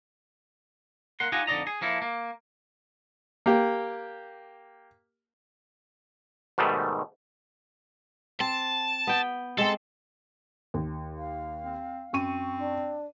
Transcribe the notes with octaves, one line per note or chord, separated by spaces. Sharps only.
A#3 A#4 F#5 C6
D#4 F4 G4 D#5 F#5 G#5
F2 D3 D#4 D5 D#5 A#5
G#4
F3 A#3 E4 A4
A#3
A#3 G4
G#2 B2 D#3 G3 A3
C4 A5
B3 G5
G#3 C4 A4
D#2
F5
C4
F#2 C4 C#6 D#7
D4